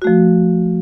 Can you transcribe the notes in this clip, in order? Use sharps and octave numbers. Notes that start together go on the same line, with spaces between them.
F3 A3 F#4